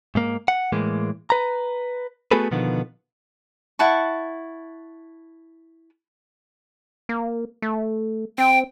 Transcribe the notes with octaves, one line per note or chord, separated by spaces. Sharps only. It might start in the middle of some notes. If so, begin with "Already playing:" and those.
G#2 A#3
F#5
A2 E3 G#3 A#3
B4 A#5
A3 B3 F#4 G#4 A4 B4
B2 D3 D#3 F3 B3
E4 F#5 A5 C#6
A#3
A3
C4 G5